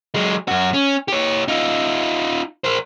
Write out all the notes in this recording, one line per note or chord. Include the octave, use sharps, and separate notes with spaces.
F#3 G#3
F#2 F#4
C#4
G4 C#5
D#4 F4
A#4 C5